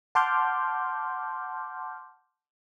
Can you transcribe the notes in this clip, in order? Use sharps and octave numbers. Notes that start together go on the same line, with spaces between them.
F#5 A5 C6 D6 F6 G6